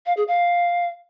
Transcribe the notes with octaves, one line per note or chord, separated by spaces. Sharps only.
F5
G#4
F5